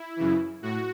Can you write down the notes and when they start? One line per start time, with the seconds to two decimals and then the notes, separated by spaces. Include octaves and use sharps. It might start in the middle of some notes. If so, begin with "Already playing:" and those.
Already playing: E4
0.16 F#2 C#3 E3
0.62 A2 F#4